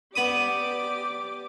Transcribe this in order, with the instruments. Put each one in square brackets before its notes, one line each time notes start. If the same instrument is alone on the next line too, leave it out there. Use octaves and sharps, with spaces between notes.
[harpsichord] B3 B5 D#6 [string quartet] G4 D5 D6